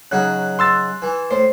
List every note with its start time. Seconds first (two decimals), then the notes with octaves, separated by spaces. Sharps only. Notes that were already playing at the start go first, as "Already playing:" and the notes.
0.11 C#3 F#3 D#4 F#6
0.59 C6 E6 A6
1.02 E3
1.31 A2 C5